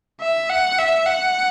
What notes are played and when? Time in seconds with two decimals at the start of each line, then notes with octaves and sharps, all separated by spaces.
0.21 E5
0.50 F#5
0.79 E5
1.06 F#5